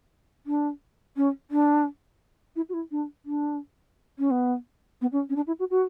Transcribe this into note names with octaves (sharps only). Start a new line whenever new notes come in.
D4
C#4
D4
E4
F#4
E4
D4
D4
C#4
B3
B3
C#4
C#4
D4
E4
F#4
F#4